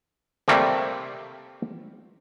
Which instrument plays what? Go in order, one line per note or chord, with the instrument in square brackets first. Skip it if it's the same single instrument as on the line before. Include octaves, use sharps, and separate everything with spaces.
[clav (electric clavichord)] C3 G3 A3 A#3 C4